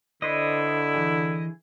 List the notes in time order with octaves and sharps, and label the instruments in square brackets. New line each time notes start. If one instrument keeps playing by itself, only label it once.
[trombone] D3 [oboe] E4 [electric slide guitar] B4 C5 D5 [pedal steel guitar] D#5
[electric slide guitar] E3 G#4